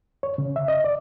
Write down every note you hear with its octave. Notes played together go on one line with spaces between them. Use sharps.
C#5
C#3
E5
D#5
D5